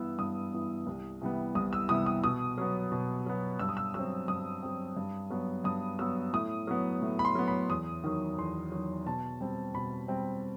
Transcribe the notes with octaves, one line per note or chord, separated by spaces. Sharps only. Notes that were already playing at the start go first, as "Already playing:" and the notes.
Already playing: G2 E3 B3 E6
G2 D#6
E3 B3
C2
C3 E3 G3 B3
C2 D#6
E6
C3 E3 G3 B3 D#6
D#6
B2 D#6
F#3 B3
B2
F#3 B3
G2 E6
D#6
E6
F#3 C4 E6
G2 D#6
F#3 C4
G2
F#3 B3
G2 D#6
F#3 B3 E6
A2 D#6
F#3 B3
A2
B5
C6
F#3 B3
B5
E2 D#6
D#3 F#3
E2 C6
D#3 F#3
B2 A5
G3 C4
B2 B5
G3 C4